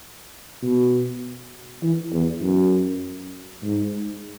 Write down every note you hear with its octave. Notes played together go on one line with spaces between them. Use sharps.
B2
E3
E2
F#2
G#2